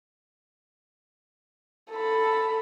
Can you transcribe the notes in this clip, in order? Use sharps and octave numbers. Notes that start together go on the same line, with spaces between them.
A4 B5